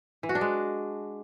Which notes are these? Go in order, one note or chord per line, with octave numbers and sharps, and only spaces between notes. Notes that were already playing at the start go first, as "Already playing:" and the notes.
E3
F#4
D4
G#3